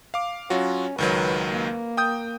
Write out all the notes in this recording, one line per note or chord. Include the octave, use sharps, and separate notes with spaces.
F5 D6
F#3 C#4 F4 F#4
C#2 D#3 F#3 B4
A#3
G5 D#6 G6